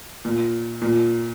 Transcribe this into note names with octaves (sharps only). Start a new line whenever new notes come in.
A#2
A#2